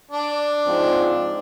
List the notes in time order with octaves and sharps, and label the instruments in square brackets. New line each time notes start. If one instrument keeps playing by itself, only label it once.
[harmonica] D4
[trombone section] G#2 F3 C4